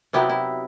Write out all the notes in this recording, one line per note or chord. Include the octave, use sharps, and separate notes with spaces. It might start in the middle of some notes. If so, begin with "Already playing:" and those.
C3 F#3 B3 D#4 E4 G4
E4